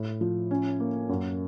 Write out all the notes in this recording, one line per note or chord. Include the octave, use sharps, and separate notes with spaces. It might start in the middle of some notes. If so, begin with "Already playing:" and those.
Already playing: A2
F3
C#4
A#3
F#2